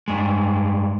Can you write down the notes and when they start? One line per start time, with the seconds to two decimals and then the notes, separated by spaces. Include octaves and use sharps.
0.08 G2 G#3